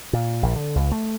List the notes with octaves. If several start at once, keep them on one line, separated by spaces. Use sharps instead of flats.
A#2
A#1
D3
C#2
A3